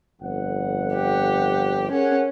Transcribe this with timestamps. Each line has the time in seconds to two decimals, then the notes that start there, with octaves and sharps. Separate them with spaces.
0.21 G1 F2 F#5
0.94 G4
1.91 C#4 G#4 A#4 F#5